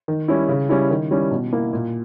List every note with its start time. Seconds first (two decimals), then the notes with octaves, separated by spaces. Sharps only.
0.08 D#3
0.28 G3 C#4 E4
0.49 C#3
0.69 G3 C#4 E4
0.91 D#3
1.11 G3 C#4 E4
1.31 B2
1.53 A#3 E4
1.73 A#2